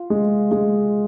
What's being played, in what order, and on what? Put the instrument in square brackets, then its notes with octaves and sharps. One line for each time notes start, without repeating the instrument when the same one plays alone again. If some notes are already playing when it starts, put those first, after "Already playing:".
Already playing: [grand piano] F4
G#3
G#3